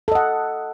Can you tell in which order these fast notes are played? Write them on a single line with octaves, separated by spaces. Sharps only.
A4 D#5 F#5